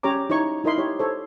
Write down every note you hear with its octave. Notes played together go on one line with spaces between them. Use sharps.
C#4 G4 C#5 A#5 D6
D#4 E4 C#5 C#6
D#4 E4 A#4 D#5 B5 C6
E4 G4 C#5
A4 C5 C#5